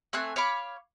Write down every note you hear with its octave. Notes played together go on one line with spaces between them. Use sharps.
A3 C4 G#5 F#6
C#5 F5 B5 D6